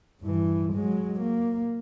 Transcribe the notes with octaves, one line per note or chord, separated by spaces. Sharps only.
G2 E3
F#3 G#3
A#3